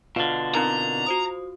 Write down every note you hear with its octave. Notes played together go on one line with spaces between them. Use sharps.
B2 D3 F4 F5
C4 D#4 A#4 A#5
F#4 C5 D#6